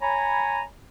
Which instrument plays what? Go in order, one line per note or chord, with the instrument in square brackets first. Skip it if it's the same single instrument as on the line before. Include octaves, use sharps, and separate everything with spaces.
[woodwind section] C#5 G#5 A#5 B5